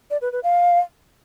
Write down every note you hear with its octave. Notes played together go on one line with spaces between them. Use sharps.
D5
B4
B4
F5